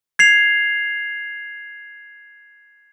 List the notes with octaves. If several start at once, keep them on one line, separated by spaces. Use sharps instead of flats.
G#6 C7 F7